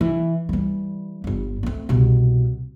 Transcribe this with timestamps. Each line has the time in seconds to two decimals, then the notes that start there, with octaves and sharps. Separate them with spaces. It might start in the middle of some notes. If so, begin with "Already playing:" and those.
0.01 E3
0.49 E3 G3
1.24 G1 G3
1.63 A3 C4
1.89 C2 B2